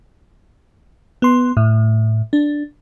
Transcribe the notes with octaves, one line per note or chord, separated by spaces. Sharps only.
B3 C6
A2
D4